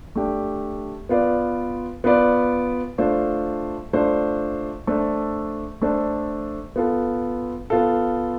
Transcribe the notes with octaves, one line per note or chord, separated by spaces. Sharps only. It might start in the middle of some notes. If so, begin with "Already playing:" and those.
A3 D4 G4
B3 F4 B4 D5
B3 F4 B4 D5
A3 D4 F4 C5
A3 D4 F4 C5
A3 D4 A4 C5
A3 D4 A4 C5
B3 F4 A4
B3 F4 A4